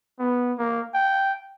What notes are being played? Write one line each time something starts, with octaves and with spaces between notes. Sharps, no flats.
B3
A#3
G5